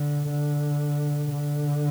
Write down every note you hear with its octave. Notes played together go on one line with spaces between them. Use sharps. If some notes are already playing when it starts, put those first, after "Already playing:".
Already playing: D3
D3
D3